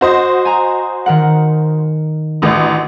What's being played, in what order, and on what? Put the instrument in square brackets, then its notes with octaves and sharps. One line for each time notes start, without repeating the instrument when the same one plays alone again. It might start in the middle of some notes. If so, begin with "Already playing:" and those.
[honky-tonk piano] F#4 C5 D#5
[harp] G#5 A#5
D#3 A#4 F#5
[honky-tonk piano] A1 D2